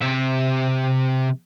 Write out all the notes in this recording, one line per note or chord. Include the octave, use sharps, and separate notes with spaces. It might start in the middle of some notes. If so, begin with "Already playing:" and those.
C3 E5